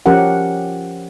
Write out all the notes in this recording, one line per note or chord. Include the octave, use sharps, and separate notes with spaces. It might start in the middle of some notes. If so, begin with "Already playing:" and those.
F3 C#4 G4 A#4 F#5